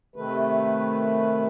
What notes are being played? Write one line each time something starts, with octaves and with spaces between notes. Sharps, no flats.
C3 D#3 A3 B4